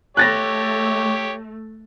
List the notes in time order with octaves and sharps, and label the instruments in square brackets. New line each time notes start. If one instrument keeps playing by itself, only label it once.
[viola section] A3 [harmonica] G4 C#5 [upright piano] F#6 A6 A#6